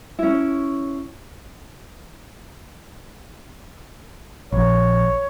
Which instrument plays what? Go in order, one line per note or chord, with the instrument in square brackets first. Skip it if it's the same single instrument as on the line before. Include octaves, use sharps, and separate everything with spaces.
[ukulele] C#4 E4
[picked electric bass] A#1 [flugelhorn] C#5